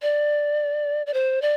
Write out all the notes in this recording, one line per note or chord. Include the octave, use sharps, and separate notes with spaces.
D5
D5
C5
D5